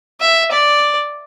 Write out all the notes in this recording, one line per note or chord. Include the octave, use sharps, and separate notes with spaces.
E5
D5